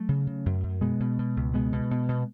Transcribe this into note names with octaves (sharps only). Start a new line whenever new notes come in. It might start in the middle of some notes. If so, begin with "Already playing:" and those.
Already playing: F#3 A3
C#3
C#3
F#2
F#2
B2 G#3 B3
B2
B2
C#2
B2 G#3 B3
B2
B2
B2